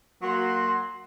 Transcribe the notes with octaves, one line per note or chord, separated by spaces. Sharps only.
F#3 A#3 F#4 C6